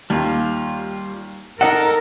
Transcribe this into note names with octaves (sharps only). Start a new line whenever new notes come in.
D#2 G3 F4
D#4 A4 A#4 D#5 F#5